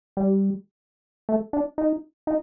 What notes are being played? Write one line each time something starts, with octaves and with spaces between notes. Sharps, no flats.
G3
A3
D4
D#4
D#4